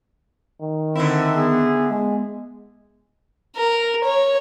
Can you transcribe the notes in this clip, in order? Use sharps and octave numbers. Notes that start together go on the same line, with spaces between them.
D#3
D3 C4 E4
B3 G#4
G#3
A#4
C#5